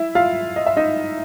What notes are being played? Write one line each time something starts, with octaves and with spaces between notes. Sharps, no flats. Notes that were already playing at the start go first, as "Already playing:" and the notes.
Already playing: E4 E5
F4 F5
D#5
E5
D#4 D#5